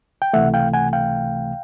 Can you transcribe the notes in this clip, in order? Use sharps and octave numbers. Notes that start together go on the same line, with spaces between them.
G5
C#2 C3 E3 A3 E5 F#5
F5 G5
F#5 G#5
F5 G5